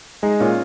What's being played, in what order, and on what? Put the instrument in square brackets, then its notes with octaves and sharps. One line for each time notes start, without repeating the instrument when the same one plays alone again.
[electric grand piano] G#3 [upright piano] D#4 G#4
[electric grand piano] A#2 [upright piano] C#4 F4